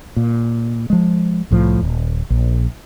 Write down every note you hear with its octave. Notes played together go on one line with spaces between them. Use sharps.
A#2
F3 G#3
C2 A2 F3
D#1
A#1